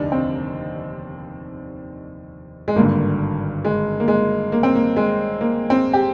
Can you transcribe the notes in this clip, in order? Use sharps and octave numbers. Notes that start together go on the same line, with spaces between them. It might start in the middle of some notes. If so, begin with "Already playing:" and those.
Already playing: F1 D#2 D3 D4 D#4
C4
G#3
G#1 G2 D3 A#3
G#3
A#3
G#3
A#3
C4
A#3
G#3
A#3
C4
G4